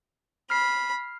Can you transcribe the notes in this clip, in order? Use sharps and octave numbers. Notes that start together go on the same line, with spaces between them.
B5 F6 C7